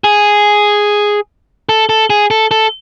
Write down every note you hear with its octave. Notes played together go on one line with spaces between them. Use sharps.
G#4
A4
A4
G#4
A4
A4